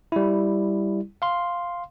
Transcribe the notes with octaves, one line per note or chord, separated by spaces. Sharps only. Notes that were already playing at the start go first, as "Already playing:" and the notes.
G3 E4
F5 C6